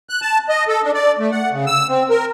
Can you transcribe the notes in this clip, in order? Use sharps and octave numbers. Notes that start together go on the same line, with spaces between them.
F#6
A5
D#5
A4
D4
D5
A3
F#5
C#3
E6
C4
A#4